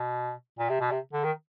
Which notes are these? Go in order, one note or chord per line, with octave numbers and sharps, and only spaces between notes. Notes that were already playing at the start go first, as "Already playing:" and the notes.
Already playing: B2
A#2
C3
B2
C3
D3
D#3